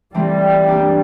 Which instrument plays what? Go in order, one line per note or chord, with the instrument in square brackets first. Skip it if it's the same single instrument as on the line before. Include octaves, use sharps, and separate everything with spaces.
[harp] E3 A3 C4 [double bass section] G3
[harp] A#3 D4 G4